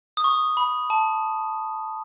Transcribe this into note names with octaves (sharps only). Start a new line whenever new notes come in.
D#6
C#6
B5
A5